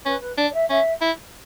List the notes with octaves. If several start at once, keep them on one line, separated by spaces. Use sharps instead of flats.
C#4 B4
B4
D4 D5
D5
E5
C#4 E5
E4